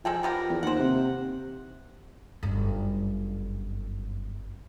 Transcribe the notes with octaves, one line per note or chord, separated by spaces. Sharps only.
F3 G#3 A4 G5
B3 G4 A#4
E2
D#2 C5 F#5
C3
G1 F#2